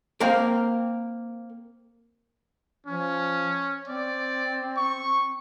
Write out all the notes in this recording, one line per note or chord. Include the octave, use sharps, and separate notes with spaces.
A#3 C4 A#4
F3 C#4
C4 D5
C#6